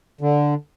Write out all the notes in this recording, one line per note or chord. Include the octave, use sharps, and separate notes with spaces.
D3